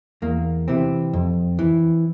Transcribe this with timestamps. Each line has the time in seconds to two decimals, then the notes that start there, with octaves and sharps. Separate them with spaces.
0.22 E2 A#3
0.68 C3 E3 C4
1.13 F2
1.59 E3